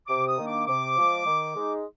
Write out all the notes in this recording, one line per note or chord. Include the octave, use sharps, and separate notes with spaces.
C3 D6
D#6
D#3 A#3 D4
D6
C3 D6
F3 G#3
D#3
G#3 D#4